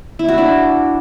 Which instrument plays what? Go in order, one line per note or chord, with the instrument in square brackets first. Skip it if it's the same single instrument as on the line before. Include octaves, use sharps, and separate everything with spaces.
[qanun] E4
F#4
D4